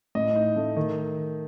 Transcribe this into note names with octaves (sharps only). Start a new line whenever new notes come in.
A2 D#5
D#4
A3
D#3